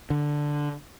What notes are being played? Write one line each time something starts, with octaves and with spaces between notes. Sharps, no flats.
D3